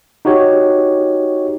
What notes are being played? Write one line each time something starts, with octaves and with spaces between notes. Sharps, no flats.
D#4 F#4 G4 C#5